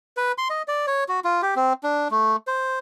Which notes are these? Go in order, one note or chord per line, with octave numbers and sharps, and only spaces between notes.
B4
C6
D#5
D5
C#5
F#4
F4
G4
C4
D4
A3
C5